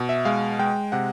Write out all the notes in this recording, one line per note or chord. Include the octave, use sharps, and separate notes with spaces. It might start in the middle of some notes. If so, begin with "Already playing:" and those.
Already playing: B2
E5
G#3 F5
G#3 G5
C3 F#5